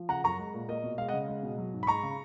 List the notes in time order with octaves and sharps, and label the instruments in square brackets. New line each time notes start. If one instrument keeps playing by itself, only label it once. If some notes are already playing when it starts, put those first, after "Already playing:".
Already playing: [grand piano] F3
C#3 F#5 A#5
F#2 A#5 C#6
G#3
A#2
A#3 D#5
B2
G#3 F5
D#5 F#5
C#3
G#3
B2
F#3
G#2
B5
G#3 A#5 C#6
C#3